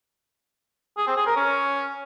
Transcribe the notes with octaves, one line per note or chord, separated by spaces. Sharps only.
G#4
C4
G#4
A#4
C#4